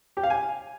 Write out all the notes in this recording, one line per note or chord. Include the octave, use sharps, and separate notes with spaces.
G4
F5
G#5